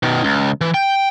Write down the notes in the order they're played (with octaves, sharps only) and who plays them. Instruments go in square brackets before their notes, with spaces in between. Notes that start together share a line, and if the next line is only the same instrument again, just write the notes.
[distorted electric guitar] B2 D#3
C#2
E3
G5